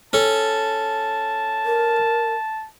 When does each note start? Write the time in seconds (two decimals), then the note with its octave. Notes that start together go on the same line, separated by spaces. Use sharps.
0.13 C#4 A4 A5
1.65 A#4